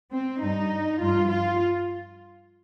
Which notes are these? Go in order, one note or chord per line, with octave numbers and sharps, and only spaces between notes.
C4
G2 G3 D#4
G2 F3 F4
F4